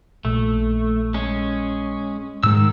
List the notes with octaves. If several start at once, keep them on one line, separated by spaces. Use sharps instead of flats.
A#1 A3
G#3 C#4
G#2 D#3 G#3 E6